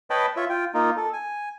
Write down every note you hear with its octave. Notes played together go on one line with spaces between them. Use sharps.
B4 C#5 D#5 G5 A5 B5
F4 C#5 E5
F4 G5
A#3 D#4 F4
A4
G#5